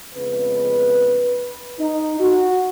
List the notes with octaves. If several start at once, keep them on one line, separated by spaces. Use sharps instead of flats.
F2 C#3 G#3 B3 B4
D#4
F#4